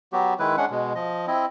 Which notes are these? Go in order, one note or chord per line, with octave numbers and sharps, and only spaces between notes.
F#3 B3 F#4 G4
D#3 G#3 E4 B4
G#3 C#4 D4 F#5
B2 G#3
F3 D#5
C4 E4 D#5